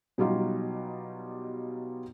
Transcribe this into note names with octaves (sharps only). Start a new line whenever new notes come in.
B2 F#3 G3 D#4 F4 G4